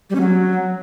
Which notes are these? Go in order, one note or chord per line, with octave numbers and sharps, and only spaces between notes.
G3
C#4
F#3